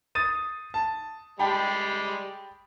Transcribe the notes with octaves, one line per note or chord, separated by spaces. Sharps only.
D#6 A6 D#7
A5
G3 G#3 G5 A5 B5